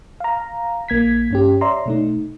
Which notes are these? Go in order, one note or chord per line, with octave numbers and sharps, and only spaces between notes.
F5 A#5
A#1 A#3 G#6 B6
G2 C#4 G4
C#5 D5 E5 A#5 C6
B2 A3 D#4